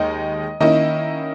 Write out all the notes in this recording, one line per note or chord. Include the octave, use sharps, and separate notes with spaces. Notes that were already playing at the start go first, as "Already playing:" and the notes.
Already playing: D#2 D#3 G#3 D#4 D#5
D#3 A#3 C#4 E4 D#5